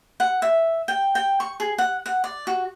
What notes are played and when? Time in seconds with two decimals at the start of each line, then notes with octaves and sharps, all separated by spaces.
0.20 F#5
0.42 E5
0.88 G5
1.15 G5
1.40 C#6
1.60 G#4
1.78 F#5
2.06 F#5
2.24 D5
2.47 F#4